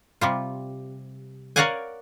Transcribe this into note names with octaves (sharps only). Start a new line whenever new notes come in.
C3 G3 F4
A#4 C#5 D5 F5 F#5 G#5